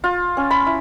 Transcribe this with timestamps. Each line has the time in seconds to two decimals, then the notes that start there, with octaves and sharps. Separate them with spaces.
0.04 F4
0.37 C#4
0.51 B5
0.67 E4